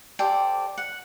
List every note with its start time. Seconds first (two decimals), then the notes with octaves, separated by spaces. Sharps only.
0.19 G4 A4 C5 D5
0.78 F#5